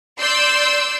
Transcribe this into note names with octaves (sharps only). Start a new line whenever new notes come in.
D5 C6 E6 G6